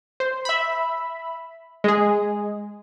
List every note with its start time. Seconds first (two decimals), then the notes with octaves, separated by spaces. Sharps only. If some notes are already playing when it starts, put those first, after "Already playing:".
0.20 C5
0.45 E5 B5
1.84 G#3 G#4